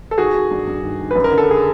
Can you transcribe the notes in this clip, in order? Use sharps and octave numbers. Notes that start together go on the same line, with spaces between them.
A4
D#3 F#4 G#4
D#3
G2
G2
D#3
D#3
F#2 B4
A#4
D3
A4
G#4